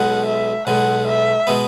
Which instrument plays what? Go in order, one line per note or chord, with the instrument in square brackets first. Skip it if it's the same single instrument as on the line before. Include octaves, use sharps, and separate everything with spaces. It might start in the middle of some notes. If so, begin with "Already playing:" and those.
Already playing: [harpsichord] B1 B2 G#3 [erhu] F#5
[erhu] E5
[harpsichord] B1 B2 G#3 [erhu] F#5
[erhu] E5
[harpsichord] B2 G#3 B3